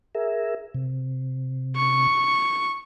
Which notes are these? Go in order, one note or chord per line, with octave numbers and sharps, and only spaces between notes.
G#4 A#4 E5
C3
C#6